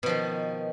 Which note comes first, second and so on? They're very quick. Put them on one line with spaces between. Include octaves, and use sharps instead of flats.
B2 F3 D#3